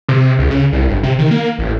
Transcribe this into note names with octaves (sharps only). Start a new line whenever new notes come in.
C3
C#2
C#3
C2
G1
C3
D#3
A#3
A1